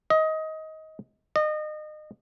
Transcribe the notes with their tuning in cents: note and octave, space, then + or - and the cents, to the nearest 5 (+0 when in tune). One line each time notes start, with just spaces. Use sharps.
D#5 +20
D#5 -30